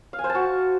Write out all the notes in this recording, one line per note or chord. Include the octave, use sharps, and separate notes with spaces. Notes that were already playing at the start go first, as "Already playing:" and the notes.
F5
G#5
C5
A5
F#4